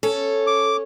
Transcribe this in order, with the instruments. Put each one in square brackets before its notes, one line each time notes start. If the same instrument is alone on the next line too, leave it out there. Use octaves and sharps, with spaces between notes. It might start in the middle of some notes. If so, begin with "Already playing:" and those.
[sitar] C#4 [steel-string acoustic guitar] A4
[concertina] D6